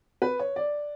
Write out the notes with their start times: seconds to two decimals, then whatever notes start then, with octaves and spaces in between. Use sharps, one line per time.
0.22 B4
0.39 C#5
0.56 D5